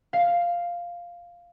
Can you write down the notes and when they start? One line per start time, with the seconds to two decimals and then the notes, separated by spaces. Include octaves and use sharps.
0.13 F5